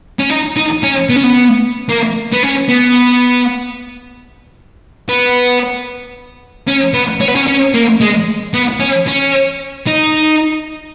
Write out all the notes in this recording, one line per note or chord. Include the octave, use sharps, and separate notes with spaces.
C#4
D#4
D#4
C#4
B3
C#4
B3
A#3
B3
C#4
B3
B3
C#4
B3
C#4
B3
C#4
C#4
A#3
G#3
B3
C#4
C#4
D#4